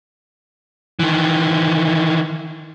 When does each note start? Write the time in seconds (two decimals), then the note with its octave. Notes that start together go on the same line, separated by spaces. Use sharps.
0.99 D#3 E3